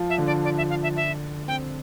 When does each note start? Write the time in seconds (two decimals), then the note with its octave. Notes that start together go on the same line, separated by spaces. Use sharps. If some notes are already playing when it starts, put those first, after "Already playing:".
Already playing: F3 F4
0.10 E5
0.18 D3 D4
0.27 D5
0.45 D5
0.57 E5
0.70 F5
0.83 E5
0.96 E5
1.47 C4 G5